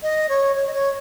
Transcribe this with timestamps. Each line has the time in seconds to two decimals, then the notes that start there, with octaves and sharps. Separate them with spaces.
0.02 D#5
0.29 C#5
0.56 C#5
0.66 D#5
0.73 C#5